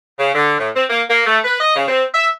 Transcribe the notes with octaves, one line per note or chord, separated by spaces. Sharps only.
C#3
D3
A2
C4
A#3
A#3
A3
B4
D#5
C#3
C4
E5